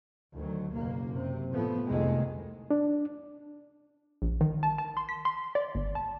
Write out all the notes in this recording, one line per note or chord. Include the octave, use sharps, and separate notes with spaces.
D2 D#3 F#3
F#1 D#2 B2 A#3
F#2 C3
A2 F3 A3 B3
C2 F2 C3 D#3 G#3 A3
D4
A#1
D#3
A5
A5
C6
B6
C6
D5
G1
A5